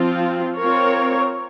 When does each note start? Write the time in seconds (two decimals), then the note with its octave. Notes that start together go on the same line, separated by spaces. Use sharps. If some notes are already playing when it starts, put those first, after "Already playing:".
Already playing: F3 C4 F4
0.58 C4 F4 A#4 C#5